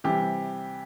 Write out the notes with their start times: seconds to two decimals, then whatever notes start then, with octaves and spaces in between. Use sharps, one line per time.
0.04 C3 E3 G3 G4